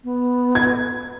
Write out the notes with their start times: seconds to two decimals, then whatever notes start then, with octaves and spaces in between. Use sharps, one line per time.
0.04 B3
0.55 G#6